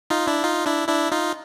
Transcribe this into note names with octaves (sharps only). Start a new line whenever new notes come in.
D#4 F4
D4 E4
D#4 F4
D4 E4
D4 E4
D#4 F4